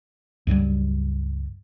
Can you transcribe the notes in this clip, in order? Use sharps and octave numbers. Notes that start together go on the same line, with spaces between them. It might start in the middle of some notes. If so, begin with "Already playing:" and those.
C#2 G2 F#3 G3